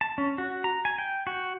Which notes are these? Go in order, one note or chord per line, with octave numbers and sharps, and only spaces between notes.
A5
C#4
F#4
A#5
G#5
G5
F#4